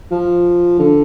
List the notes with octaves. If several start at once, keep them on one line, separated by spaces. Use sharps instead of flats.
F3
D3